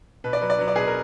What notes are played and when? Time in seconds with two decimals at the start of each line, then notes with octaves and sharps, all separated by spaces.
0.24 B2 B4
0.33 D5
0.41 F#3 B4
0.50 D5
0.59 F#3 B4
0.68 D5
0.75 B2 G#4 B4
0.87 A#4